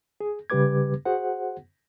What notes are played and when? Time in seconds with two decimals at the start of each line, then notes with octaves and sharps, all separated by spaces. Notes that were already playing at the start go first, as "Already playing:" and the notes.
0.21 G#4
0.50 C#3 G3 G4 B4 D6 G#6
1.05 F#4 G#4 C5 F#5